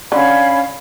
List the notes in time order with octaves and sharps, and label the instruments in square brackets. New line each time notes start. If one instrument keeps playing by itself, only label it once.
[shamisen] D3 [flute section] C#4 F5 B5